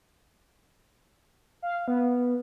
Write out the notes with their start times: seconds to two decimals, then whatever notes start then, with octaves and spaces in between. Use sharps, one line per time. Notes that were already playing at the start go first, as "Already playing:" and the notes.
1.62 F5
1.88 B3